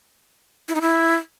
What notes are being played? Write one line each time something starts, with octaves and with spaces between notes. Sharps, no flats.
E4
D#4
E4